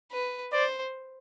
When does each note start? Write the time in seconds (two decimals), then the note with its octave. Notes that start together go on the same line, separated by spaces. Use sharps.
0.12 B4
0.53 C5 D5